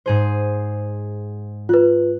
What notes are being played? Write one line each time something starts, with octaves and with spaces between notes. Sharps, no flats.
G#2 G#4 C5
F4 B4 F#6